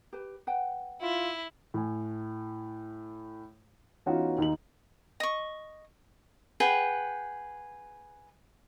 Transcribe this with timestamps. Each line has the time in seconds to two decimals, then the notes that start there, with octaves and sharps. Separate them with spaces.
0.13 G4 B4
0.47 B4 F#5 G5
1.01 E4 F4
1.74 A2 G#5
4.06 E3 B3 C#4 D#4 F4 F#4
4.38 D#2 D#4 F#7
5.20 D#5 C#6
6.60 G#4 B4 F#5 G5